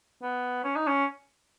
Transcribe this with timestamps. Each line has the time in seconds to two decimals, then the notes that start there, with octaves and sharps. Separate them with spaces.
0.23 B3
0.64 C#4
0.76 D#4
0.87 C#4